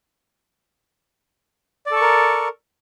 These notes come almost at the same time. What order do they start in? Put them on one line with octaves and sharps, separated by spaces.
D5 A4 C#6 A#4